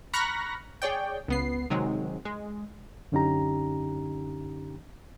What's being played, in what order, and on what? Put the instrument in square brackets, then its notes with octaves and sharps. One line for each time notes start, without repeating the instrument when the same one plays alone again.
[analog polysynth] A#5 B5 C#6 F6 F#6 A#6
G#4 C#5 D5 G5
C#2 B3 C7
C3 D#3 F#3 G#3
G#3
[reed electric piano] F#2 D3 C#4 D#4 G4 A#5